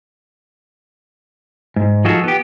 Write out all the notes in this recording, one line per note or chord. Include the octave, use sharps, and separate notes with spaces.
G#2
F3 D#4 F4 F#4 G#4 A4
B3 G4